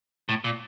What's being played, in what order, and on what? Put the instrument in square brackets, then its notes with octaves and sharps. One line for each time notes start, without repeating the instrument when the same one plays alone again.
[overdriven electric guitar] A2
A#2